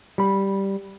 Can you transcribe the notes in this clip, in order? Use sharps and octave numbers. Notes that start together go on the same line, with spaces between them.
G3 B5